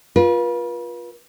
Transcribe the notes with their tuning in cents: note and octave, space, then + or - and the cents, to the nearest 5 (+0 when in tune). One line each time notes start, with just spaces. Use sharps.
F4 +10 B4 -40